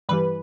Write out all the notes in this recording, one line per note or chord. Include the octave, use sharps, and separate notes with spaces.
G2 E3 G3 B4